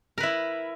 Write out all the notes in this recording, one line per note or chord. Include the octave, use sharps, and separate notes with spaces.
E4 A#4 B4